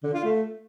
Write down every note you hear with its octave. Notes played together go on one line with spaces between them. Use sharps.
D3
F4
A3